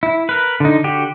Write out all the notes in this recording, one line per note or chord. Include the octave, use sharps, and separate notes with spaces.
E4
A#4 B4
D3 D#4
D3 F#4 G4